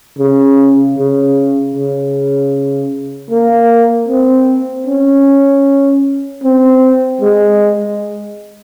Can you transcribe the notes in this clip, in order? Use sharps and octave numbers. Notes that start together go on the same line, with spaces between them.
C#3
C#3
C#3
A#3
C4
C#4
C4
G#3